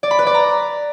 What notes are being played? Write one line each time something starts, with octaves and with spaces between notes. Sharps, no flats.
D5
B5
B4
D5
A#5